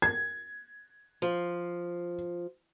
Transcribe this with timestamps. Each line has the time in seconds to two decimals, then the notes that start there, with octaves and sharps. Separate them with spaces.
0.02 G#6
1.22 F3